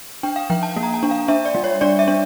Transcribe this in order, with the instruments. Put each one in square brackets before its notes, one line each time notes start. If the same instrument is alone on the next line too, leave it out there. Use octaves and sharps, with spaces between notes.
[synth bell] D4 G5
F5
F3 G5
A5
A#3
A#5
A5
D4
F5
D4 E5
D5
G3
C#5
D4 D5
E5
D4